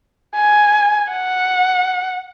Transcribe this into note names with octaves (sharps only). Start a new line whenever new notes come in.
G#5
F#5